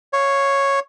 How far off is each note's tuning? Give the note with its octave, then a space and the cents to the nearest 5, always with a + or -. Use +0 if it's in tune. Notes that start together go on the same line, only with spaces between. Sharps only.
C#5 -5 F5 +0